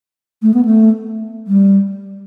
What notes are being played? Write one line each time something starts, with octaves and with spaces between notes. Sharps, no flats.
A3
B3
A3
G3